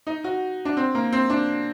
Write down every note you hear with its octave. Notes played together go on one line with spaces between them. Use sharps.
D#4
F#4
D4
C4
A#3
C4
D4